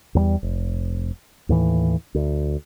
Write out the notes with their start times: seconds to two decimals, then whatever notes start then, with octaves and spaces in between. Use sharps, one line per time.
0.15 E2 F#3 G3
0.43 F1
1.49 D#2 A2 E3
2.15 D2